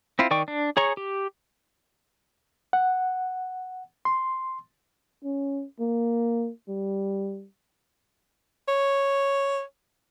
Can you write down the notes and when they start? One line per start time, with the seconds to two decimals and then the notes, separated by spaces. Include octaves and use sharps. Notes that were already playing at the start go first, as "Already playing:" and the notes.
0.19 C4 E4 F4
0.31 D#3 D5 G5 C#6
0.48 D4
0.77 G#4 C#5 A#5 C#6
0.97 G4
2.73 F#5
4.05 C6
5.24 C#4
5.80 A#3
6.68 G3
8.68 C#5